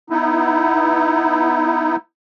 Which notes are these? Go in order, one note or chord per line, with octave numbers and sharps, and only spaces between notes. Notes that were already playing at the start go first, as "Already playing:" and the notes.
B3 D#4 E4